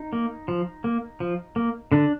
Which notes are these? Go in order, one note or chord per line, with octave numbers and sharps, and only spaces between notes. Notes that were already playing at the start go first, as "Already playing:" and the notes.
Already playing: D#4
A#3
F3
A#3
F3
A#3
D3 D4